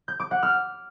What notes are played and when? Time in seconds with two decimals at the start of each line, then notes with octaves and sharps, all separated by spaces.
0.08 G6
0.20 D6
0.31 F#5
0.43 F6